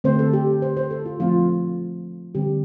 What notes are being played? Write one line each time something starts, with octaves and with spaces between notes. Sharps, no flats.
D3 A3 C4 C5
A4
G4
C5
C5
A4
F4
F3 A3 C4 F4
D3 G3 C4 G4